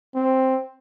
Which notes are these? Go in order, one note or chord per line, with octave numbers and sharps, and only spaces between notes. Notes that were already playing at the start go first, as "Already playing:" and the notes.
C4